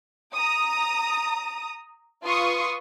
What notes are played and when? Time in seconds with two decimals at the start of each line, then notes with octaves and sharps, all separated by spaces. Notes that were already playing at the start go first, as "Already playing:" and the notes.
0.34 A#5 D#6
2.25 F4 B4 C6 C#6 D#6